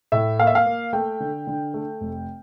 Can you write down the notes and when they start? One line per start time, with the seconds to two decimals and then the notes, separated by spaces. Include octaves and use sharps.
0.12 A2 E5
0.39 A#3 F5
0.47 E5
0.55 F5
0.66 A#3
0.93 A3 G5
1.20 D3
1.47 D3
1.74 A3
2.01 F1